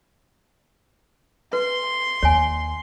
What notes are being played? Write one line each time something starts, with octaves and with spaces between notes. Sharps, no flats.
B4 C6
D#2 C#5 G#5